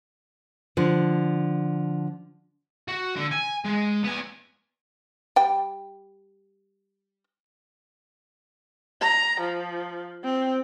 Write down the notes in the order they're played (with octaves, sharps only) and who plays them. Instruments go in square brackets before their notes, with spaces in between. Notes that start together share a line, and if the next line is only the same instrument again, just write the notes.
[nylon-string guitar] D3 F3
[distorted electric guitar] F#4
D3
G#5
G#3
B3 G#5
[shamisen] G3 G5
[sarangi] A#5
F3
C4